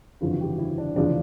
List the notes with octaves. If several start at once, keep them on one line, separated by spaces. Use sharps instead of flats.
G1 F2 C#3 E3 F4
F#4
G4
F#4
E4
D4
F1 E2 C#3 F3 D4